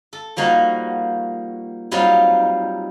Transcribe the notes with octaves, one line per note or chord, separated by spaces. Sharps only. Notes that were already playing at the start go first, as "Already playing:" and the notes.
A4
F3 G3 A#3 D#4 F#4
F#3 G3 C4 D#4 F4